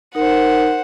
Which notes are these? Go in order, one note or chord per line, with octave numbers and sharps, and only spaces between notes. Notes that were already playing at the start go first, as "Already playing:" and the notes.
D#4 A#4 C5 F#5